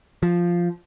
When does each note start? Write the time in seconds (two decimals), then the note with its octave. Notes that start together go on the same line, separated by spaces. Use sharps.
0.23 F3